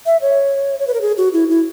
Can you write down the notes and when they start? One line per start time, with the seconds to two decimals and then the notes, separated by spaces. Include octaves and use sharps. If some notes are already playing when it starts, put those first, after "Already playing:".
0.06 E5
0.22 C#5
0.79 C#5
0.87 B4
0.94 A#4
1.01 G#4
1.17 F#4
1.33 E4
1.49 E4